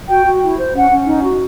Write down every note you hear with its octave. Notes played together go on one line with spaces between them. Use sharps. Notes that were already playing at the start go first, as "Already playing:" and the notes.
F#4 G5
F#4
E4
C5
C#4 F#5
C#4
D#4
F#4